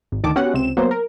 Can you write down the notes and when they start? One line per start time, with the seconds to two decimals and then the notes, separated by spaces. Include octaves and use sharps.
0.12 G#1
0.24 D2 D#3 A5 D6
0.36 B3 C#4 F#4 G4 F#5
0.53 C#2 C3 C4 E7
0.77 F#3 A#3 B3 C5
0.91 A#4